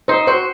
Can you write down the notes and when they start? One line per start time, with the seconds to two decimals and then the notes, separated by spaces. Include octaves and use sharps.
0.08 D#4 C5
0.27 F#4 C5